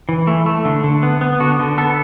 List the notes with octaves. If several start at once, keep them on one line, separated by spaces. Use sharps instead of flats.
E3
A3
A3
D3
D3
B3
B3
D3 F#4
D3
B3 A4